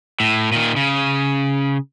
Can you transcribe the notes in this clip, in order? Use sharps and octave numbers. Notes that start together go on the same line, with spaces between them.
A2
A#2 D#3
C#3